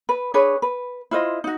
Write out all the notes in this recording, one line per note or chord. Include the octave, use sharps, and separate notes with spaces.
B4
D4 G#4 B4 C#5
B4
E4 F4 C5 D#5
D#4 F#4